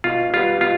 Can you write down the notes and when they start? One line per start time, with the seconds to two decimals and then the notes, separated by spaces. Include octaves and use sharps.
0.04 B2 F4
0.33 G3 B3 F4
0.61 B2 F4